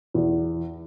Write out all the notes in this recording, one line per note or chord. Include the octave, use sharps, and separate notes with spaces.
E2